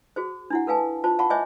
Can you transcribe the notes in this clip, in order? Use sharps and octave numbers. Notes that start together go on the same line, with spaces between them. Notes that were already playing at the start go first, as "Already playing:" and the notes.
F#4 G#4 C5
D4 E4 F#5
A4 B4 F5 G#5 A5
F4 C5 A5
F5 F#5 A5 B5 C#6
C5 C#5 D#5 E5 G#5 D6